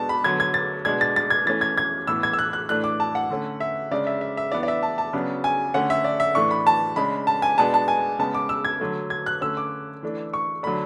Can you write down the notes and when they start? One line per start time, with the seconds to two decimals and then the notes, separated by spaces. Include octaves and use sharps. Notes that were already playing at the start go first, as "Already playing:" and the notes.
Already playing: B2 G#3 B3 D4 A5
0.09 B5
0.24 D3 F#3 B3 G#6
0.40 G#6
0.54 A6
0.85 B2 G#3 D4 G#6
1.01 A6
1.16 A6
1.30 G#6
1.46 E3 A3 C#4 A6
1.61 G#6
1.78 G#6
2.07 A2 E3 B3 E6
2.23 G#6
2.33 E6
2.39 F#6
2.53 F#6
2.69 A2 E3 A3 D4 F#6
2.84 D6
3.00 A5
3.15 F#5
3.30 D3 A3 C#4
3.60 E5
3.91 C#3 G#3 D4 D5
4.07 E5
4.21 E5
4.37 E5
4.52 E3 B3 D4 D5
4.63 D5
4.68 E5
4.83 A5
4.98 A5
5.13 C#3 F#3 B3 D4
5.44 G#5
5.74 D3 A3 C#4 F#5
5.90 E5
6.04 D5
6.20 E5
6.35 A2 E3 A3 D4 C#6
6.51 B5
6.67 A5
6.96 C#3 G#3 D4 B5
7.27 A5
7.42 G#5
7.58 B2 G#3 B3 D4 A5
7.74 A5
7.88 G#5
8.19 C#3 G#3 B3 A5
8.34 D6
8.49 E6
8.65 G#6
8.80 D3 F#3 A3
9.10 G#6
9.26 F#6
9.41 D3 A3 C#4 E6
9.57 D6
10.03 E3 A3 D4
10.34 C#6
10.63 D3 F#3 A3 D4 B5